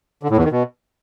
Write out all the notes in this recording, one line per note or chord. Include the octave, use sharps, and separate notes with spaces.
D3
A2
E2
D#3
B2